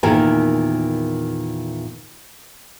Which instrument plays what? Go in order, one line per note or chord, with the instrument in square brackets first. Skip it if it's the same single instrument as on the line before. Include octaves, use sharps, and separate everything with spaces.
[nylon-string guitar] E2 A#2 D#3 E4 A#4 G#5